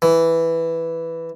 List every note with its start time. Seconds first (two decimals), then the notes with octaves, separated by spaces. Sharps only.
0.02 E3